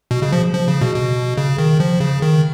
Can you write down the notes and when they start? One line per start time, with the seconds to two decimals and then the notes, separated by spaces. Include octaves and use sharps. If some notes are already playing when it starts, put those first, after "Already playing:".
0.11 B2
0.22 C#3
0.32 F3
0.53 F3
0.68 C#3
0.81 B2
0.96 B2
1.38 C#3
1.58 D#3
1.80 F3
2.00 C#3
2.22 D#3